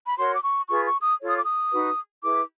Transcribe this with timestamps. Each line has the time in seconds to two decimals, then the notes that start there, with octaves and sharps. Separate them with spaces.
0.07 B5
0.18 F#4 A#4 C#5 C6
0.34 D6
0.44 C#6
0.69 F4 G#4 B4 C#6
0.86 C#6
1.02 D#6
1.20 F4 A4 C#5
1.28 D#6
1.37 D6
1.45 D#6
1.72 D#4 F#4 B4
2.23 E4 G#4 B4 D6